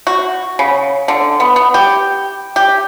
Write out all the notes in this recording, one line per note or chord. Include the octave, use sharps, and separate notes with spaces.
F#4
C#3
D3
B3
B3
G4
G4